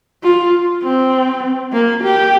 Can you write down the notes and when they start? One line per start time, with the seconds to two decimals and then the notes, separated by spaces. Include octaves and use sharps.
0.23 F4
0.83 C4
1.73 A#3
2.04 G4